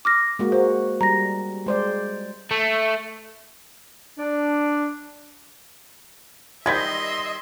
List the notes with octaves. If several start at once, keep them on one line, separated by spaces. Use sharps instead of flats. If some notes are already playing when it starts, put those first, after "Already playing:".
D6 F6 A#6
G#3 A#3 F#4
F#4 C5
G3 A#5 A#6
G#3 C5 D5
A3
D4
D#3 G3 C5 D#5 E5 C6 G#6 B6